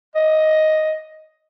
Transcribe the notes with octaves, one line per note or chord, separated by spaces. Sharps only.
D#5